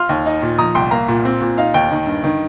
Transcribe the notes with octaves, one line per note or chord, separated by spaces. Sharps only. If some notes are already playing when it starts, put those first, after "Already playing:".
Already playing: F4 C6 F6
D#2
D#4
A#2
F3 A#5 D#6
C2 G5 C6
A#3 F5 A#5
A#2
C4
A#2
D#4 F5
D#2 G5
D#3
G2
D#3